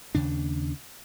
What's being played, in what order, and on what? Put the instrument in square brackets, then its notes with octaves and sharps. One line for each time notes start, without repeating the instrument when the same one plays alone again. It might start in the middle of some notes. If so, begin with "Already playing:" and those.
[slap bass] D#2 C#3 D4